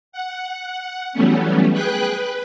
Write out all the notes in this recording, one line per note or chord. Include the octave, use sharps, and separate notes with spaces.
F#5
E3 F#3 G3 A3 B3 C#4
G#4 B4 G5 F#6
B4